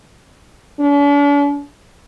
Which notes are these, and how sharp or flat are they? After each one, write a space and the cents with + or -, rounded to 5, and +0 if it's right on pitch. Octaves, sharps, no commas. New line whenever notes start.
D4 -45